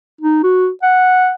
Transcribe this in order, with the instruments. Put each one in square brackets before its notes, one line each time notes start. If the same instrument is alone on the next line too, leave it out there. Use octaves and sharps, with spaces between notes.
[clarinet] D#4
F#4
F#5